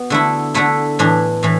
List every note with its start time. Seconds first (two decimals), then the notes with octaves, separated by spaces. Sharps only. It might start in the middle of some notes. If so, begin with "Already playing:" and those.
Already playing: B3 F#4
0.10 D3 A3 E4
0.54 D3 A3 E4
0.99 A2 E3 D4
1.43 A2 E3